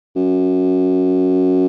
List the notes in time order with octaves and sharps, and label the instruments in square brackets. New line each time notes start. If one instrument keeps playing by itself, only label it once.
[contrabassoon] F#2